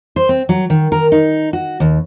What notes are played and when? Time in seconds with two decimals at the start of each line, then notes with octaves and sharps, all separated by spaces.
0.16 C5
0.29 C4
0.49 F#3
0.70 D#3
0.92 A#4
1.12 D#4
1.53 F#4
1.80 D#2